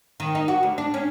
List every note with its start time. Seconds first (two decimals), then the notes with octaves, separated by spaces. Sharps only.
0.20 D#3
0.35 D#4
0.48 F#4
0.63 D2
0.78 D4
0.94 C#4